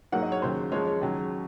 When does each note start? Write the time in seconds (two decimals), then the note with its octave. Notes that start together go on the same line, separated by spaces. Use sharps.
0.12 G#2 F#3 A#3 F#5
0.23 D#5
0.32 C#5
0.42 D#2 C#3 F#3 A#3 C5
0.72 F#2 F3 G#3 C#5
0.87 C#5
1.01 D#2 C#3 F#3